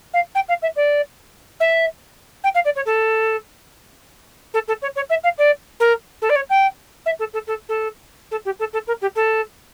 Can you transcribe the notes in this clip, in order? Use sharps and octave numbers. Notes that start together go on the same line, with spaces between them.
F5
G5
F5
E5
D5
E5
G5
F5
D5
C#5
A4
A4
A4
C#5
C#5
E5
F5
D5
A#4
A4
D5
C#5
G5
E5
A4
A4
A4
A4
A4
G4
A4
A4
A#4
G4
A4